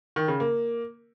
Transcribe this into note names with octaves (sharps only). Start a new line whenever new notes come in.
D#3
C#3
A#3